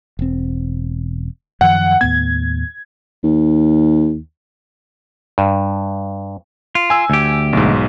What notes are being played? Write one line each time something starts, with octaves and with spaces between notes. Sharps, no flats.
E1 C4
F#2 D#3 F3 F#5
D#2 A2 B3 G#6
D#2
G2
F4
G#5 E6
D2 G4
B1 G#2